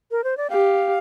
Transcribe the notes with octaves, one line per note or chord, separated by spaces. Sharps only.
A#4
C5
D5
G4 F5